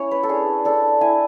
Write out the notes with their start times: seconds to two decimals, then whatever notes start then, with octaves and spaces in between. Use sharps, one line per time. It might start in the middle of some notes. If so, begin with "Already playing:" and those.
Already playing: C#4 E4 C#5
0.11 B4
0.23 A4
0.29 D4 G#4
0.65 D4 A4
1.01 E4 G#5